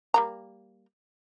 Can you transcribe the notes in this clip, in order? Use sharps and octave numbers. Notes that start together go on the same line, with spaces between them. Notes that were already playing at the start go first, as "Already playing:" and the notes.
G3 A#3 A#5